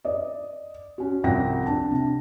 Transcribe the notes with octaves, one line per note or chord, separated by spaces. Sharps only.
D5 D#5
C#4 F#4
C2 F3 F#5 G5 A#6
D4 A5
C3